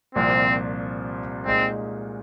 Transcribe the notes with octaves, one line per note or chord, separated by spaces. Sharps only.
C2 A#2 F3 C4
A#2 G#3 C4 D#4